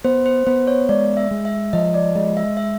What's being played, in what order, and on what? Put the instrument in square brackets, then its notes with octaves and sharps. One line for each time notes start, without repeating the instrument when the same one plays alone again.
[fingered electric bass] B3 [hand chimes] C5
[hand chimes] C5
[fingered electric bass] B3 [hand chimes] C5
[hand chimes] C#5
[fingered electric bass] G#3 [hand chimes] D5
[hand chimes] E5
[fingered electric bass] G#3
[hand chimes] E5
[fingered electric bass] F3 [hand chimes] D#5
[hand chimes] D5
[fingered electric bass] G#3 [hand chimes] D#5
[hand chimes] E5
E5